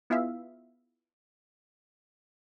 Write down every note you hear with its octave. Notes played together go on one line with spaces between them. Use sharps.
B3 E4 F4 G#4 E5 F5